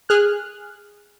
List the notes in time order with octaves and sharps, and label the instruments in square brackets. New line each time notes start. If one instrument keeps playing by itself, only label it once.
[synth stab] G#4 F6 F#6